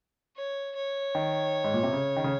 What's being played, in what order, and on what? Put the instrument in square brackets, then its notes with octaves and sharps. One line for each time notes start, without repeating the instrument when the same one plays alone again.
[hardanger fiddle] C#5
C#5
[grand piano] D#3
G#2
A#2
C3
C#3
D#3
C#3